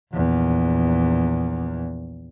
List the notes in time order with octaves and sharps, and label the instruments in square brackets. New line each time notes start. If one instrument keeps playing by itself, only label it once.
[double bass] A#1 E2